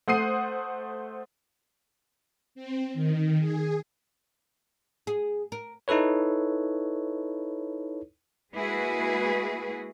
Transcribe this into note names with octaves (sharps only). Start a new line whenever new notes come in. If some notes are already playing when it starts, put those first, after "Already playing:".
A3 C5 F#5 D#6 C7 D#7
C4
D#3
G#4
G#4
A#4
D#4 E4 A4 B4 C#5
G#3 A#3 E4 F#4 G#4 B4